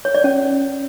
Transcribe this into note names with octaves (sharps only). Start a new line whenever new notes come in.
C#5
D5
C#4